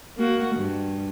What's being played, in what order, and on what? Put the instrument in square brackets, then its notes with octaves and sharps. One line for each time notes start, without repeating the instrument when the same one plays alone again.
[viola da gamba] A#3 F#4
G2